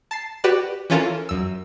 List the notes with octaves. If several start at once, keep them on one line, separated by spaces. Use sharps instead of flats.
A5 A6 C7
F#4 G4 B4 D5
E3 C#4 F4 A4 A#4
F#2 E6